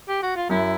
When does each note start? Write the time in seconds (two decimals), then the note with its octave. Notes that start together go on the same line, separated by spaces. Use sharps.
0.09 G4
0.23 F#4
0.36 F4
0.49 F#2 E4